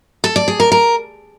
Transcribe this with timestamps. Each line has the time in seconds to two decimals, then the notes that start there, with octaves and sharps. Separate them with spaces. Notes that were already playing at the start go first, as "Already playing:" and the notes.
0.24 A4
0.36 D5
0.48 G#4
0.60 A#4
0.72 A#4